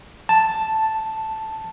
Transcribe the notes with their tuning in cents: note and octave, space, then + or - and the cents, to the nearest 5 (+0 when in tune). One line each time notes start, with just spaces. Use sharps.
A5 +0